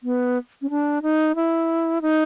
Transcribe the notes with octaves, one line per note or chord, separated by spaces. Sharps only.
B3
C#4
D4
D#4
E4
D#4